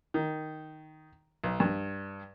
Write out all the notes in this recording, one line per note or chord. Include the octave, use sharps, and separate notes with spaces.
D#3
B1
G2